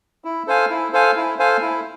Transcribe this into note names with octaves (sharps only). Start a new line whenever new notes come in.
E4
A4 C5 F5 G#5
E4
A4 C5 F5 G#5
E4
A4 C5 F5 G#5
E4